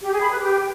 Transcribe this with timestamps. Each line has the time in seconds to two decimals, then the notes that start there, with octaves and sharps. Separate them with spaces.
0.02 G4
0.11 G#4
0.21 B5
0.30 B4
0.39 G4